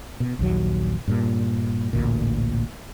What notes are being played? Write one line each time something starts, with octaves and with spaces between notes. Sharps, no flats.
B2
A#1 D#2 F#3
G2 A#2
A1 D2 A#2